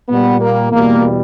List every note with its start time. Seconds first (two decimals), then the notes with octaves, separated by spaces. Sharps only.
0.09 A#2 G3 B3
0.41 A#3
0.72 E2 B2 G3 A#3